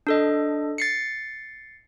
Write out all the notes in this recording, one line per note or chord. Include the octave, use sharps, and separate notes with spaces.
D4 A4 D#5
A6 C7 C#7